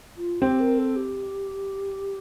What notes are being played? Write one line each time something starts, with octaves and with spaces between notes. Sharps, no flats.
F4
C4 G4
A#4
A4
G4